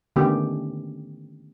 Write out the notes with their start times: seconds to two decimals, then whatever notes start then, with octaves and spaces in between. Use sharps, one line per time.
0.16 D3 D#3 A3 B3 C#4 G4